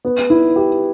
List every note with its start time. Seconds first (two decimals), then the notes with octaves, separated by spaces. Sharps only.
0.05 B3
0.30 E4
0.56 G4